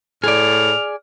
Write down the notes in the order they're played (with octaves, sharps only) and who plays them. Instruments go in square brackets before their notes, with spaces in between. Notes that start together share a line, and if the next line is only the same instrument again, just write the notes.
[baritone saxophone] A2 [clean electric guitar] G#4 D5 [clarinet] F6